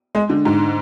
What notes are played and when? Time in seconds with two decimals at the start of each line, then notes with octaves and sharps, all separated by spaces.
0.15 G#3
0.30 D3
0.45 G#2